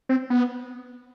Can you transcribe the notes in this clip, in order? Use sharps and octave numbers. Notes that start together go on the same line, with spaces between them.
C4
B3